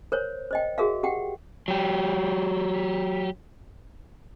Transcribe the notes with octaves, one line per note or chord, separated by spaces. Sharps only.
A#4 C5 C#5
C5 D#5 G5
F#4 G#4 A#4 E5 F5
G4 F#5 G5
F#3 G4